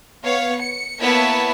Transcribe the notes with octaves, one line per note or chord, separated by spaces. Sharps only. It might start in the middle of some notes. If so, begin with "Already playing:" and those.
B3 C#5 F5
C#7
A#3 B3 E4 C#5 E5 A5